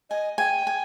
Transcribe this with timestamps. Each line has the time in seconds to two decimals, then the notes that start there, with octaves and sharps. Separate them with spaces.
0.10 D#5 G#5
0.38 G5 G#5
0.67 G#5